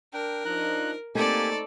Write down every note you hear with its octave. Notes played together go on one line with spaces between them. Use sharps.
D4 A#4 G5
F3 D4 D#4 A#5 F#6
A3 A#3 C4 D#4 G4 A4 D5 G#5